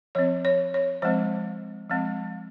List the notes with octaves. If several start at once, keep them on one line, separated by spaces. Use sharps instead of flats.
F3 C4 C#5
C#5
C#5
F3 G#3 C4 C5
F3 G#3 C4